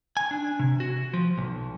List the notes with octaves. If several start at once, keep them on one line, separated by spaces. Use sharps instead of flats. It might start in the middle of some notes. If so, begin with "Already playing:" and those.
G#5
D4
C3
F#4
F3
B1